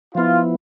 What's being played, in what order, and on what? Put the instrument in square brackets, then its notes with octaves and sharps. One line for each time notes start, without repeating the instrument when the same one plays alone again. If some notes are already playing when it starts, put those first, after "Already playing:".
[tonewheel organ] F3 B3 E4 [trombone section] F4